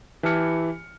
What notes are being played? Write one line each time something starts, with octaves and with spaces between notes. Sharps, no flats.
E3 E4 G4 A5 F6 C#7